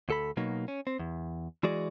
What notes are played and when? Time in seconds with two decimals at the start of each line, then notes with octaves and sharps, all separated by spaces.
0.09 D2 A4 B5
0.37 B2 F#3 A#3 D#4
0.68 C#4
0.87 C4
0.99 E2
1.63 E3 G#3 F#4 G#4 D5